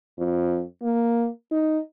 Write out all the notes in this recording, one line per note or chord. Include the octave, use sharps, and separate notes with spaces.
F2
A#3
D#4